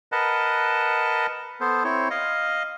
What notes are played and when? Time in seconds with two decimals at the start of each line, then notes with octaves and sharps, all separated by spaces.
0.12 A#4 B4 D#5 F#5 A5
1.61 B3 A4 C5
1.84 C4 E4 C#5
2.11 D#5 F5